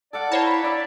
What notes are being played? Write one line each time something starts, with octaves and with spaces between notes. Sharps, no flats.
A4 D5 F5 F#5
E4 C5 C#5 A5 A#5
B5
D4 D5 E5